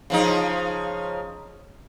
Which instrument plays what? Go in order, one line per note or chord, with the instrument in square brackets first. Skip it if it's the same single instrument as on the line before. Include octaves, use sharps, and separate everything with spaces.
[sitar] C#3 F3 D#4